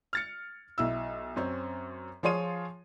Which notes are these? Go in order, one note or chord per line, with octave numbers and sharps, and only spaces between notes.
F6 A6 C#7
B1 E4 E6
F#2 C4 C#4
F3 F4 G#4 C#5 C6 D#7